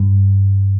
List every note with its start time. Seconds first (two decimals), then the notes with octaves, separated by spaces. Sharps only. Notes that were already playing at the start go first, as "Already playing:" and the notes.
Already playing: G2